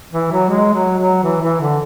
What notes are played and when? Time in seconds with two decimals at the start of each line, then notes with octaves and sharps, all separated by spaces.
0.12 E3
0.31 F#3
0.49 G#3
0.73 F#3
0.98 F#3
1.23 E3
1.42 E3
1.60 D3